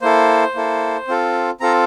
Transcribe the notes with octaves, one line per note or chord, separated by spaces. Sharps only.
A#3 E4 A4 C5
A#3 E4 A4
C4 F4 A4
C4 F4 A4 A#5